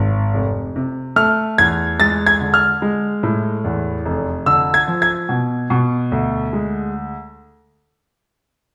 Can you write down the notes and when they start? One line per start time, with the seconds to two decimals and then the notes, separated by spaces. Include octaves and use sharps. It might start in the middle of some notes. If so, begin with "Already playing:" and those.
Already playing: G#1
0.34 F1
0.76 C3
1.16 A3 F6
1.58 E2 G#6
1.99 G#3 A6
2.26 G#6
2.40 D3
2.54 F6
2.82 G#3
3.23 A2
3.64 E2
4.06 F1
4.46 D3 E6
4.74 G#6
4.88 F3
5.02 G#6
5.29 B2
5.70 B2
6.12 D2
6.53 G#3